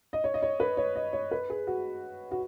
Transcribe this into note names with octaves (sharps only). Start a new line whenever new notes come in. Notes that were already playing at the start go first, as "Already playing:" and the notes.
D#5
C#5
D#5
C#5
B4
C#5
D#5
C#5
B4
G#4
F#4
F#4